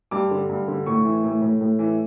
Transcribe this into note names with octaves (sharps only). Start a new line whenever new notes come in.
G2 D6
D3
G2
D3
A2 C#6
E3
A2
A2
A2
E3